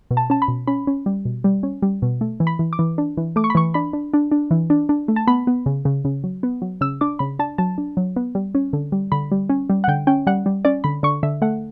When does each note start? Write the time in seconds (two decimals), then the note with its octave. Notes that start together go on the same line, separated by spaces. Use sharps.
0.11 B2
0.17 A5
0.30 C#4 A5
0.42 B5
0.48 B2
0.67 C#4 B5
0.87 C#4
1.06 G3
1.25 B2
1.44 G3
1.63 C#4
1.82 G3
2.02 B2
2.21 A3
2.40 E3
2.47 B5
2.59 E3
2.73 D6
2.79 E3
2.98 D4
3.17 E3
3.36 A3 D6
3.44 C#6
3.50 B5
3.55 E3 C#6
3.74 D4 B5
3.93 D4
4.13 D4
4.31 D4
4.51 E3
4.70 D4
4.89 D4
5.08 A3
5.16 A5
5.27 B3 B5
5.47 B3
5.66 C#3
5.85 C#3
6.05 C#3
6.24 F#3
6.43 B3
6.62 F#3
6.81 C#3 E6
7.01 D4 D6
7.19 C#3 B5
7.39 D4 A5
7.58 F#3 A5
7.78 D4
7.97 F#3
8.16 B3
8.35 G3
8.55 C#4
8.73 D3
8.92 G3
9.12 D3 B5
9.31 G3
9.49 C#4
9.70 G3
9.84 F#5
9.88 D3 G5
10.07 C#4 G5
10.27 G3 F#5
10.46 G3
10.65 C#4 D5
10.84 D3 B5
11.03 D3 C#6
11.23 D3 E5
11.42 A3 F#5